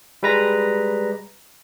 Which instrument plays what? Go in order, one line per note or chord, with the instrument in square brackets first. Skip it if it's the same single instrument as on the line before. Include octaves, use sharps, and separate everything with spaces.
[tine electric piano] G3 G#3 B4 A#5 A#6